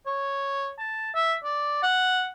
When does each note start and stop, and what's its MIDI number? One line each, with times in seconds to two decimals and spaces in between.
0.06 0.72 73
0.79 1.10 81
1.15 1.34 76
1.44 1.78 74
1.83 2.31 78